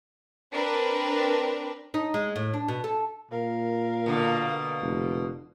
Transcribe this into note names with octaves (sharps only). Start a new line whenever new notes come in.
C4 D4 A#4 B4
D#4
G#3
A2
D4
B2
A4
A#2 A#4 F5
B2 D3 A#3
F1